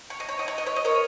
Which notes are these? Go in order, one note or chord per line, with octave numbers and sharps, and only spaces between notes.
C#5
D#5
C#5
D#5
C#5
D#5
C#5
D#5
A#4 C#5